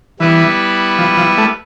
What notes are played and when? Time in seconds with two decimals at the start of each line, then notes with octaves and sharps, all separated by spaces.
0.20 E3 G3 B3 E4 B4
0.99 F3
1.17 F3
1.38 A3